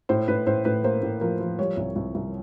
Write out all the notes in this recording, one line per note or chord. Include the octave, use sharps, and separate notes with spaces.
A2 C5
A2 B4
A2 C5
A2 B4
A#3 C5
A2
F3 A#4
F3
G3 C#5
C2
C2
C2